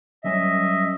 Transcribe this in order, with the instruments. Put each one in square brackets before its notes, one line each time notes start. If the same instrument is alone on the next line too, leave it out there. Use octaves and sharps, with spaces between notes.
[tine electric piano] F#3 G3 C#4 [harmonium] D#5 E5